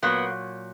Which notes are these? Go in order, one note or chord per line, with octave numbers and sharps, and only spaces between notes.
A#2 F#3 A#3 B3